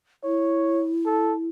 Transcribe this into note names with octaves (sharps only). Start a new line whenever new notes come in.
E4 C#5
A4